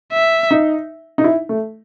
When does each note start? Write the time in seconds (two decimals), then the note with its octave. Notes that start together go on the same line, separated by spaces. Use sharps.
0.13 E5
0.51 D#4
1.18 D#4
1.24 E4
1.49 A3